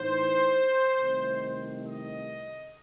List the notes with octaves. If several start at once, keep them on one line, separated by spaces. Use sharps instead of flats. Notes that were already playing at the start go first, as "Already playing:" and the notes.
Already playing: A2 E3 B3 D#4 C5
C2 C3 D#3 A3
D#5